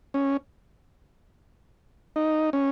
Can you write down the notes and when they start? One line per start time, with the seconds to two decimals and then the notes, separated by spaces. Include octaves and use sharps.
0.14 C#4
2.16 D#4
2.53 C#4